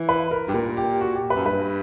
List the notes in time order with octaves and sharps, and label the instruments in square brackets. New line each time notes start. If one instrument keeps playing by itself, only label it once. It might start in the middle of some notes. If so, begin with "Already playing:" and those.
Already playing: [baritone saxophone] E3
[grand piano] B4
A#4
[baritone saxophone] G2 [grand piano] G4
[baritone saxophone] A#2 [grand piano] A#4
[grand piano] G4
F#4
G4
B4
[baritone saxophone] F#2
[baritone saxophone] G2 [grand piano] B4